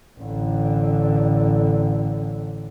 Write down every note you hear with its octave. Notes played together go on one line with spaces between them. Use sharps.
A1 D3